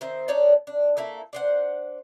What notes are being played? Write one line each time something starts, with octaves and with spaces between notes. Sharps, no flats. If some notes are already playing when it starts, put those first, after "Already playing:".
D#3 C4 C5 E5
D4 D#4 C#5 D5
D4
A3 A#3 E4
D4 C5 F#5